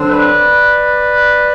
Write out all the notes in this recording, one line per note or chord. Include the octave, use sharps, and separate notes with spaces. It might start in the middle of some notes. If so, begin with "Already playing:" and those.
Already playing: D3 F#3 C4
B4 D5